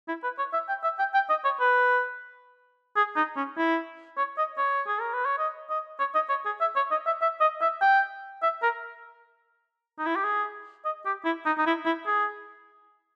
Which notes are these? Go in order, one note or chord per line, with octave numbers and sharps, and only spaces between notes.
E4
B4
C#5
E5
G5
E5
G5
G5
D#5
C#5
B4
G#4
D#4
C#4
E4
C#5
D#5
C#5
G#4
A#4
B4
C#5
D#5
D#5
C#5
D#5
C#5
G#4
E5
C#5
D#5
E5
E5
D#5
E5
G5
E5
A#4
D#4
E4
G4
G#4
D#5
G4
E4
D#4
D#4
E4
E4
G#4